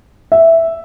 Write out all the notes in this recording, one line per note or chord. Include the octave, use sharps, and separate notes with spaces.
E5